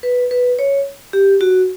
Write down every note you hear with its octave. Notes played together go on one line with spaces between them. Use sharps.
B4
B4
C#5
G4
F#4